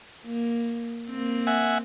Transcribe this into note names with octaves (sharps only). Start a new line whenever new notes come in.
A#3
A#3 C4
E5 F#5 G#5